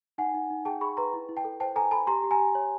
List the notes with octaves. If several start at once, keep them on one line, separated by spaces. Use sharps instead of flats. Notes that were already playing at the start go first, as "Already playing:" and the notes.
D#4 F#5 G#5
D#4
D#4
G#4 G5 A5
G#4 B5 C#6
B4 A#5 C6
E4
E4
G5 A5
A4
C5 G5 A5
A4 G#5 A#5
A4 A5 B5
G4 A#5 C6
G4
G#5 A#5
G4
C#5